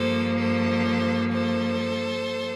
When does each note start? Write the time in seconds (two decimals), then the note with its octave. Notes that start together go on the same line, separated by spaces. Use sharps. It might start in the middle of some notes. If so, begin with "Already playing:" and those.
Already playing: G2 F3 A#3 A4 C5
0.37 A4 C5
1.32 A4 C5